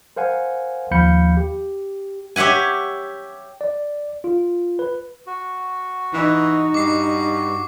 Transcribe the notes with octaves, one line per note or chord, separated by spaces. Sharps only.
A#4 C5 F5 F#5 G#5
D#2 F3 F5 B5 G6 C#7
G4
G4 C#5 E5 F#5 G#5
D5
F4
B4
F#4
E3 D#4
G2 D6 C7